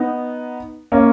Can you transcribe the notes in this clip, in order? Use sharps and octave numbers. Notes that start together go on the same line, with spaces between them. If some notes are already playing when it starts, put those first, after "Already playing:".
Already playing: B3 D#4
A#3 C#4